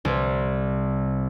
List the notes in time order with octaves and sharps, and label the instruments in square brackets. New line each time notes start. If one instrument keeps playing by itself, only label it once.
[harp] C2